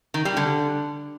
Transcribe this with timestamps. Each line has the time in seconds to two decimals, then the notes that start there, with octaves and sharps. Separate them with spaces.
0.14 D#3
0.25 G3
0.37 D3